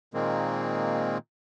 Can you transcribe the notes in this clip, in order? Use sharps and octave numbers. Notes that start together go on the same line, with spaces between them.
A#2 D#3 G#3 A#3 C4